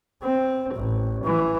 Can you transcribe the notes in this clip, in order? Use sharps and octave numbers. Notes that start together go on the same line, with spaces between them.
C4
A1
E3